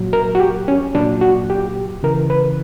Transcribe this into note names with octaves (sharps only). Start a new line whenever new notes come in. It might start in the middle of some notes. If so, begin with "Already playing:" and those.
Already playing: A#2 F#3
A#4
F#4
G4
C#4
A#2 F#3 D4
F#4
G4
C#3 E3 A#4
B4